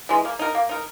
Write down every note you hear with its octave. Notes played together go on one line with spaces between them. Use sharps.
E3 G#3
A#3
D#4 A#4
A#3
D#4 A#4